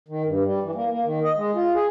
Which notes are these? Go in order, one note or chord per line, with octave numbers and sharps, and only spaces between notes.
D#3
G2
G3
E3
A#3
A#3
D#3
D#5
G#3
F4
G#4